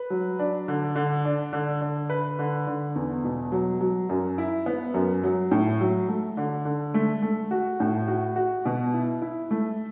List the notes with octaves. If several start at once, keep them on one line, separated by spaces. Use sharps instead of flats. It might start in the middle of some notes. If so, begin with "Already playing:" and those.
Already playing: B4
F#3
D4
D3
D3
D4
D3
D3
B4
D3
D3
E2
B2
F#3
F#3
F#2
E4
B3
F#2
F#3
A2
F#3
A3
D3
D3
A3
A3
F#4
A2
F#4
F#4
B2
E4
E4
A3